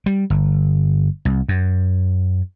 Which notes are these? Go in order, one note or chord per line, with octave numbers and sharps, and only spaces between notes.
G3
G1
C2
F#2